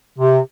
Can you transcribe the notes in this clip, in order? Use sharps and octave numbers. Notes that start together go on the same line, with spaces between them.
C3